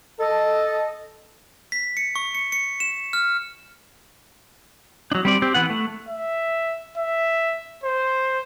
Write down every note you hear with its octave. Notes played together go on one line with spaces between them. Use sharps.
A4 D#5
B6
C#7
C#6
C#7
C#7
E7
F6
F#3 D4
G3 C4 D5
C4 G4
E3 B3 F#5
A3
E5
E5
C5